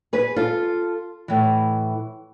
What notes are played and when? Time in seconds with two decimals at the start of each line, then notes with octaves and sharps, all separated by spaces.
0.13 G#4 B4
0.36 F4 A4
1.28 A2 E3